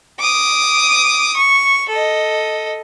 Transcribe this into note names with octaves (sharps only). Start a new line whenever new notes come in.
D6 D#6
C#6
A4 D#5